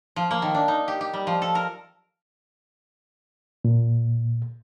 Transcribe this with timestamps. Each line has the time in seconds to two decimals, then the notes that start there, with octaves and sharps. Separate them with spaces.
0.16 F3
0.31 A#3
0.42 D#3
0.54 D4
0.68 D#4
0.88 G4
1.01 G4
1.13 G3
1.27 F3
1.42 A4
1.55 A#4
3.65 A#2